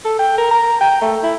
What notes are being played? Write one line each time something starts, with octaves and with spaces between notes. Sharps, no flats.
A4
G5
A#4
A#5
G5
A3
E4